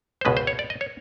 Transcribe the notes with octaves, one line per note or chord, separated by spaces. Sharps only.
C5
C#2 B2 G#3 B4
C5
C#5
D5
D#5
C#5